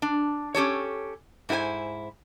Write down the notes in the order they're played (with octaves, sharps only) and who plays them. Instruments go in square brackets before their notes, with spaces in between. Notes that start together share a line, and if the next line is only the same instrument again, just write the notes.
[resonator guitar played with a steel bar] D4
C#4 G4 A4 C#5
G#2 E4 G4 C5 G#5